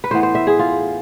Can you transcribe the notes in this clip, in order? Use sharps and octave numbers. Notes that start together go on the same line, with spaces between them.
B4
A2 E3 B3 C5
C5
E5
G#4
F4